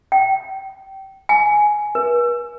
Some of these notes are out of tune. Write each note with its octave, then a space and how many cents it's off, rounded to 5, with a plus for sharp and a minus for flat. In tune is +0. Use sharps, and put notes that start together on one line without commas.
G5 -20
G#5 +10
B4 -45